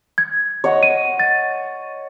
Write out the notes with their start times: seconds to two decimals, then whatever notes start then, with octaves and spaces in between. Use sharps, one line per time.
0.18 G#6
0.64 C#5 D#5 F#5
0.83 D#7
1.20 A6